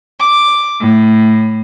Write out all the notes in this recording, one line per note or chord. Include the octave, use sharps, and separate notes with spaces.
D6
A2